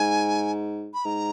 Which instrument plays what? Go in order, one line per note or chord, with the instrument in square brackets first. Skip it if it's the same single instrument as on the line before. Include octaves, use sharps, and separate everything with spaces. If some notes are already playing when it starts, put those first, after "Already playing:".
Already playing: [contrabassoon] G#2 [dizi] G#5
[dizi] B5
[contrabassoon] G#2 [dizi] A#5